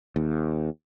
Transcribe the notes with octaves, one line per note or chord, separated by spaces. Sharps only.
D#2